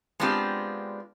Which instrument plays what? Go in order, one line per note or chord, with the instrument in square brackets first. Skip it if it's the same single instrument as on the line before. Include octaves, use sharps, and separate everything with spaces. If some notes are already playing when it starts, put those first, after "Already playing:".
[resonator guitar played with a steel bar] G#3 B3 C4 D4 F4 G4